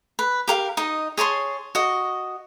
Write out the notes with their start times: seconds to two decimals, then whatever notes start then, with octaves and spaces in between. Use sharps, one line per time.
0.19 B4
0.48 G4 A#4 F5
0.77 D#4 D#5
1.18 G#4 C#5 A5 C6
1.75 F#4 D#5